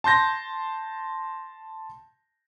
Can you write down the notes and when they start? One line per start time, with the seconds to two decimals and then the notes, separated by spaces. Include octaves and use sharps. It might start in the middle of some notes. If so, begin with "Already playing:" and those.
0.04 A5 C6 G6 A#6